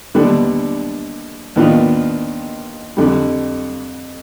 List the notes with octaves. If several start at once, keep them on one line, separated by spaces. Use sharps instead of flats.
D#2 D3 G3 B3 D4
D#2 D#3 B3 D4 F4
F2 D3 G3